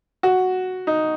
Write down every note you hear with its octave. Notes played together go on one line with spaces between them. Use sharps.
F#4
D#4